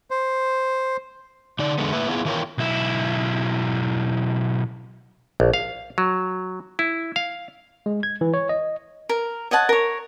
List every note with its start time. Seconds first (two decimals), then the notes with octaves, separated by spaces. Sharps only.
0.11 C5
1.59 D3 D#4 D5
1.78 E2 D3 G#3 A3 B3
1.93 A2 A#3 B4 E5
2.08 B3 E4 F4 G#4
2.25 D#3 E3 F4 A#4 C#5 G5
2.58 B1 E4
5.40 A#1
5.54 F5
5.98 F#3
6.79 E4
7.16 F5
7.86 G#3
8.03 G#6
8.21 E3
8.34 C#5
8.49 D#5
9.09 A#4
9.51 C#5 D#5 F#5 A5
9.69 A#4 C#5